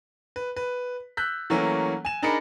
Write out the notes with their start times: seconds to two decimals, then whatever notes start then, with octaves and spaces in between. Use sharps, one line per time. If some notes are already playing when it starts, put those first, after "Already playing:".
0.36 B4
0.56 B4
1.17 E6 F#6 G6 B6
1.50 E3 F#3 A3 A#3 C#4
2.05 G#5 E7
2.22 D4 D#4 G#4 A#4 B5 C#7